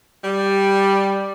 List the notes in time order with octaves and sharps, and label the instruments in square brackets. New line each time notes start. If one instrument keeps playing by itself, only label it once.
[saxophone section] G3